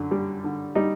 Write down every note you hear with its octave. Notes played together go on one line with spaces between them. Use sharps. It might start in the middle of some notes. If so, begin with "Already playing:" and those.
Already playing: F#2 D3
G3
D3
G3 D#4